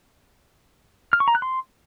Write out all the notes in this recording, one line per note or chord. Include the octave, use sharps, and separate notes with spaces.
F6
C#6
A#5
F#6
C6